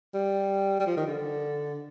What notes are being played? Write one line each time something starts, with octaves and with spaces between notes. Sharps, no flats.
G3
G3
F3
D#3
D3